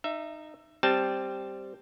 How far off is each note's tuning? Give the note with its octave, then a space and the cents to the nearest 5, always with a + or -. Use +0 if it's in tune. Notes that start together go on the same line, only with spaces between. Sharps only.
D#4 -15 E5 +15
G3 +0 C4 +0 A5 +0